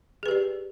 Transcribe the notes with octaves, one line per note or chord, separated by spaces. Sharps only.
G4 G#4 B4 D5